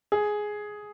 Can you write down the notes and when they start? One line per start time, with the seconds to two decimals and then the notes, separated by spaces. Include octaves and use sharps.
0.12 G#4